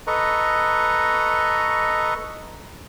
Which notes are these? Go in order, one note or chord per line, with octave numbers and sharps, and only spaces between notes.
A4 B4 D#5 A#5 C#6